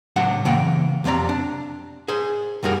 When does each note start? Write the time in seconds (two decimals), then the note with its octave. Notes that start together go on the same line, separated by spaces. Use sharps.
0.16 C#2 A2 F#3 D4 F#5
0.45 C#3 E3 A#3 F#5 G5
1.04 B1 F2 C3 D5 A#5
1.29 D4
2.08 G#4 C5
2.63 B1 F#2 G3 F#4 G#4 A#4